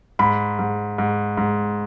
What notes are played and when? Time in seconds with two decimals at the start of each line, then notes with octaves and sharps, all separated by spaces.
0.19 G#2 B5
0.59 G#2
0.98 G#2
1.37 G#2